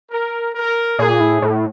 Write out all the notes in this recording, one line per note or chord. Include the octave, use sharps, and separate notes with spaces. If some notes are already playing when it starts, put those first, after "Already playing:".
A#4
A#4
A#2 G#4
A2
A2